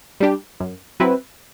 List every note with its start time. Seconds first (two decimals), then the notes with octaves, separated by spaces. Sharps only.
0.20 G3 D4 G4
0.60 F#2
1.00 F#3 C4 E4 B4